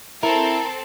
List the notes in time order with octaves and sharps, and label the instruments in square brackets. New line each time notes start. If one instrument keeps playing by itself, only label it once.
[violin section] C4 A4 [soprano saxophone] E4 [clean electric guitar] A#4